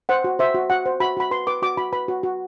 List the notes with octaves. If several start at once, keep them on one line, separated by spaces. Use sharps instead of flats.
C5 F#5
F#4
C5 E5
F#4
F#4 F#5
C5
F#4 B5
F#4 B5
B4 C6
B4 D6
F#4 D6
F#4 B5
B4 B5
F#4
F#4